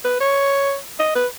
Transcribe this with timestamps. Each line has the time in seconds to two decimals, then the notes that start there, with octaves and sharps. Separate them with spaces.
0.05 B4
0.20 C#5
0.99 D#5
1.15 B4